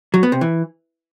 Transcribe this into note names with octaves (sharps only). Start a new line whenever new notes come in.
F#3
B3
C3
E3